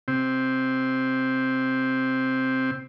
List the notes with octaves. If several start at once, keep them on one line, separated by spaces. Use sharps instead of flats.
C3 C4